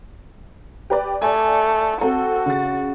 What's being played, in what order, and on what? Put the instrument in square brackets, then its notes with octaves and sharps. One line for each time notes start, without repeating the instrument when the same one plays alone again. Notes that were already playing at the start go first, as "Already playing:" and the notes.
[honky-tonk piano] G4 B4 D5
[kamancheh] A3 [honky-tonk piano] D5 G#5
[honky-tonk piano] C4 A4 [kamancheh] F#4
[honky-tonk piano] C#3 A6